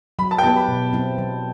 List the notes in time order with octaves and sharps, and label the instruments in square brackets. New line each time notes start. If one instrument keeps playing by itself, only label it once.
[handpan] F#3 [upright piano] B5
[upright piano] A5
G5
[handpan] B3 E4 G4 B4 [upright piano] A5
[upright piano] B5
[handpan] B2
F#3 C4 E4
F#3